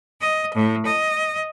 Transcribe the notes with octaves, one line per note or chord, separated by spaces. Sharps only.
D#5
A2
D#5